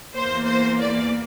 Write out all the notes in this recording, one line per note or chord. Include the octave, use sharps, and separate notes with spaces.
E2 E3 A#3 C5
C5
D5